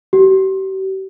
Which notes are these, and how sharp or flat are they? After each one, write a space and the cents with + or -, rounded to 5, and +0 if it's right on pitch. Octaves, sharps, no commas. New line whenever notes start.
G4 -40